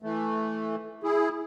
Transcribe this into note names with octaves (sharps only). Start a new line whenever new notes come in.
E3 A3
E4 G#4